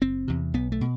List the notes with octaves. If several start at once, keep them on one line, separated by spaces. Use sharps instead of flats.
F#1 C4
E2 C3
B1 B3
A3
B2